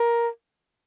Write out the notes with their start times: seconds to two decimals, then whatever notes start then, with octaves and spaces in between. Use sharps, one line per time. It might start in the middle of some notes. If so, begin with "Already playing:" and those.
Already playing: A#4